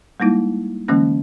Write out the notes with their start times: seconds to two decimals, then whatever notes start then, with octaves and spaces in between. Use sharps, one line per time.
0.20 G3 G#3 A#3 D#4 E4
0.88 D3 E3 F#3 G#3 A#3 C#4